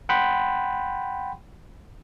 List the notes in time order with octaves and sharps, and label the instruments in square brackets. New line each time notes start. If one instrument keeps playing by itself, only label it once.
[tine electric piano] F#5 G5 B5 C6